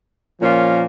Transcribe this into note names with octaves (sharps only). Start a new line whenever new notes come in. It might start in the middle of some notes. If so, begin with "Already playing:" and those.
A#2 F3 A#3 C#4 F4